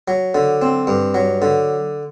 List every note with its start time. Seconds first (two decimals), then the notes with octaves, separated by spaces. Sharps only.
0.08 F#3
0.34 D3
0.62 C4
0.87 G2
1.14 F#3
1.42 D3